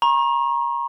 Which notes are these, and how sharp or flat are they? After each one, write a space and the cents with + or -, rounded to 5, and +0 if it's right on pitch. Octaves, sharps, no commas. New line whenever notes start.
A#5 +30 C#6 -35